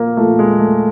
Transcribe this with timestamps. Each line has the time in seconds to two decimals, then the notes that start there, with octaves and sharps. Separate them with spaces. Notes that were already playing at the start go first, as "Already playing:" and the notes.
Already playing: A#2 F3 A#3
0.17 A#2 F3 A3
0.39 G#3
0.59 A3